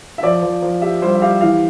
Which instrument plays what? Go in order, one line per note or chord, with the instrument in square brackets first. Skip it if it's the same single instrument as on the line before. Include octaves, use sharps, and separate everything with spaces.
[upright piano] E5
[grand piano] F3 [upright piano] D5
[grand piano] F3
F3
[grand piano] G4 [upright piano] E5
[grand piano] G3 [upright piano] C5
[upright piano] E5
[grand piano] G4 [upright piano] F5
[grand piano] E3 [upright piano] F5